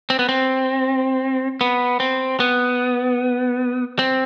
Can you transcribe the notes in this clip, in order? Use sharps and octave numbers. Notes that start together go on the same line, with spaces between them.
C4
B3
C4
B3
C4
B3
C4